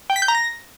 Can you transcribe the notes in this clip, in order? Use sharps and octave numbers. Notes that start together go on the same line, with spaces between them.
G5
B6
G6
A#5
A#6